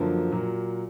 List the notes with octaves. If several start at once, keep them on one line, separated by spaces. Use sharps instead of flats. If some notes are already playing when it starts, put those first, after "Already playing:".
Already playing: F#2 D3 F3 A#3
A#2 F#3 A#3